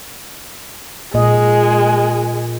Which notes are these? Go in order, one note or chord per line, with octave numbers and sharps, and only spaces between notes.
A#2 G#3 D#5